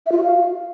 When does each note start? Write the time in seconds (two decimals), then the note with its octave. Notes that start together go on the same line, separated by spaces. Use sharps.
0.06 E5
0.12 F4
0.17 F#4
0.23 F5